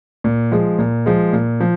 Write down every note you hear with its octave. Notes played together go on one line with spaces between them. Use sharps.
A#2
F3 G#3
A#2
F3 G#3
A#2
F3